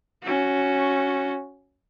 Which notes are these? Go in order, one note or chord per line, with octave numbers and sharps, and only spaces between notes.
C#4 F#4